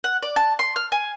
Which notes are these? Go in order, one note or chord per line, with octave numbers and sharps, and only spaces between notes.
F#5
D5
A5
C6
F6
G#5